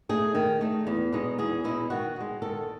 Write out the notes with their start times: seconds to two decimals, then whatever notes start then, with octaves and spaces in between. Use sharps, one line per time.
0.09 A3 D#4 G#4
0.35 D#3
0.61 A3 D#4
0.87 E2
1.12 B2 G#3 D#4
1.38 E2 G#4
1.64 B2 G#3 D#4 E4
1.90 D#3 F#4
2.16 G#3 D#4
2.42 D#3 A4